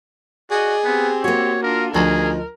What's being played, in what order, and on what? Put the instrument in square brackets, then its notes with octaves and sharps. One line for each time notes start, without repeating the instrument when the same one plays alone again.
[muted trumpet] F#4 [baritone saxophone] G#4 [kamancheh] D5 D#5
[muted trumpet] B3 [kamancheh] C4 G4
[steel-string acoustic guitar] A#3 F#4 [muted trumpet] C#5
[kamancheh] D4 F4 [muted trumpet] A#4
[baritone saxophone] D2 [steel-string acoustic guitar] F3 D#4 [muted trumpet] G#4 [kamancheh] A#4